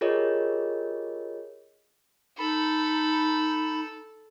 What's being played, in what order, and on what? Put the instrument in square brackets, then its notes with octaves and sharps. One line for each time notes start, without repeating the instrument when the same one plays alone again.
[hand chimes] F4 G4 G#4 A#4 C#5 D#5
[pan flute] D#4 [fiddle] A4 [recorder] B5